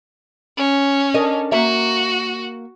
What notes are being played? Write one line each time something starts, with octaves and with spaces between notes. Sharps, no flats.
C#4
D4 A#4 D#5
A#3 F#4 E5